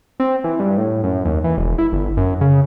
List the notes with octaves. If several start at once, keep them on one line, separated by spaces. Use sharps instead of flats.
C4
E3
G2
A2
F#2
D#2
E3
E1
E4
G1
F#2
C#3